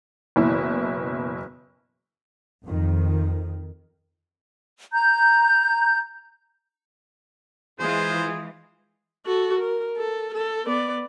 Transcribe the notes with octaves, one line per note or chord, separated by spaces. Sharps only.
F#1 B2 E3 E4
F2 D#3
A#5 G6
E3 G#3 F4 G#4 C5
F#4 A4
A#4
A4
A4
B3 D5